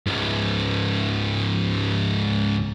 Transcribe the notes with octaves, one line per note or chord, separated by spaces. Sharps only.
C#2 G#2